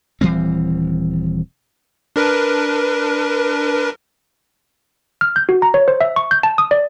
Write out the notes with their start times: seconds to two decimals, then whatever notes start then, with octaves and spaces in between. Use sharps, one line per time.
0.21 D#1 E3 G3 C4
2.16 D4 A#4 B4
5.21 F6
5.36 G6
5.49 F#4
5.62 A#5
5.74 C#5
5.88 C5
6.01 E5
6.16 C#6
6.31 G6
6.43 A5
6.58 D#6
6.71 D5